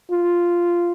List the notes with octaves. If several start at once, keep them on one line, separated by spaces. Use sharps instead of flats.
F4